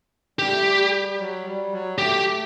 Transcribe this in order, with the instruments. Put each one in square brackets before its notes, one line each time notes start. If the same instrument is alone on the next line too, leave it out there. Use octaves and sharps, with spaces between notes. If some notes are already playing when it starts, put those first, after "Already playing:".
[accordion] G3 [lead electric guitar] G4
[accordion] A3
G3
F#3
G3
F#3
[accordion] A3 [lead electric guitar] G4